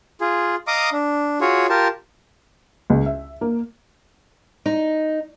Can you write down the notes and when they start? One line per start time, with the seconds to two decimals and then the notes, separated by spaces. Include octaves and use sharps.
0.21 F4 G#4
0.67 D#5 F5 A#5 D6 D#6
0.92 D4
1.41 F4 F#4 G#4 C#5
1.70 F4 G4 A#4 A5
2.90 C#2
3.06 E5
3.41 A#3
4.66 D#4